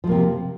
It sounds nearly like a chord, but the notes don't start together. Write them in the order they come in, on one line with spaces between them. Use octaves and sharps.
F3 G#3 A#3 C3